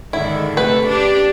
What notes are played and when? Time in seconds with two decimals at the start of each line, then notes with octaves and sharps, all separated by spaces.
0.13 G#2 D3 D#3 E4
0.57 C3 A3 B4
0.87 D4 G4